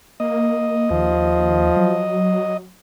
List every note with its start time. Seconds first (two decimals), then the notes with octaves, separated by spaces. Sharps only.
0.20 A#3 D#5
0.91 D#2 F3
1.77 F#3